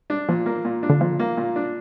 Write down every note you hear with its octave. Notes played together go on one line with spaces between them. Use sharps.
D4
A#2 F3
A#3
A#2
D4
D3
A#2 F3
A#3
A#2
D4